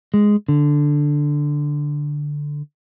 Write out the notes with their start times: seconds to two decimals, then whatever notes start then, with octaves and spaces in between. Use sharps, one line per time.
0.14 G#3
0.49 D3